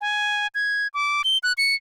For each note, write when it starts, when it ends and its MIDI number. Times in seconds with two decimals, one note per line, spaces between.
0.01 0.47 80
0.55 0.87 92
0.94 1.22 86
1.24 1.38 103
1.43 1.53 90
1.58 1.75 97